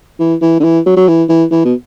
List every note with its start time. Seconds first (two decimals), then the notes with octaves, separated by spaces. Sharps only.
0.20 E3
0.42 E3
0.60 D3
0.64 E3
0.86 F#3
0.97 F#3
1.08 E3
1.29 E3
1.51 E3
1.65 B2